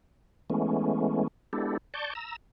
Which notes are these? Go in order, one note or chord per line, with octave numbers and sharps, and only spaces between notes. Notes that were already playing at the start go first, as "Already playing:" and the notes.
E3 G#3 A3 B3 C#4
G#3 B3 D4 E4 G4 A4
D5 A5 C#6 G6
A#5 E6